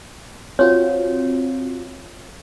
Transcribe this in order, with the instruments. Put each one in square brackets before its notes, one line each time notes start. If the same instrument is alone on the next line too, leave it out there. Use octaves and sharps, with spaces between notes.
[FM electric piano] C4 F4 F#4 [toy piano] C#5